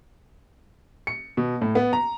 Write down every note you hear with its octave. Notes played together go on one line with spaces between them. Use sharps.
C#7
B2
A2
B3
A#5